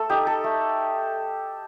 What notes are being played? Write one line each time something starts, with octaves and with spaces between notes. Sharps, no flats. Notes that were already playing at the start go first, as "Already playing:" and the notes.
Already playing: A3 A4
D#4 G4
A4
A3